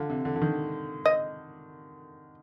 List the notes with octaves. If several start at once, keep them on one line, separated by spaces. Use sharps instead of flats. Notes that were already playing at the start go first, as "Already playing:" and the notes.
Already playing: D3 F4
C3
D3
D3
D#3
D#5